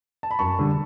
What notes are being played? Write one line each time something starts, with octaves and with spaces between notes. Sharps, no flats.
A5
B5
F#2 A5 C#6
D3 G3